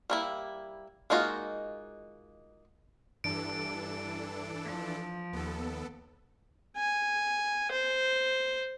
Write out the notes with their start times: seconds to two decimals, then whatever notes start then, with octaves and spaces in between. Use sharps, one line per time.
0.10 G3 A#3 E4
1.10 G#3 A#3 D#4 F4 F#4
3.24 G2 E3 D4 A4 D7
4.65 F3
5.33 D#2 B3 A4
6.77 G#5
7.72 C5